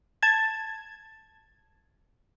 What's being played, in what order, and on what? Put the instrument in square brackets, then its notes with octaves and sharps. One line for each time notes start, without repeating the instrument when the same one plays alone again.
[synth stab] A5 G#6